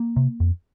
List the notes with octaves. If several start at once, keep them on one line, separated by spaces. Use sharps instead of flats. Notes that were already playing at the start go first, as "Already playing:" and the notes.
Already playing: A#3
C3
F2